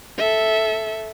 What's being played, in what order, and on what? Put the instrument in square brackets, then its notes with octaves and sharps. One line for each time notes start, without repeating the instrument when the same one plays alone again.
[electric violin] A4 E5